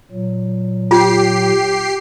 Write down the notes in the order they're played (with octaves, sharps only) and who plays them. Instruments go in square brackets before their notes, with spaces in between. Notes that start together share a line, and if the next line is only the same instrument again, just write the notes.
[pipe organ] A#2 F#3
[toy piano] F4 [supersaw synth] G4 C7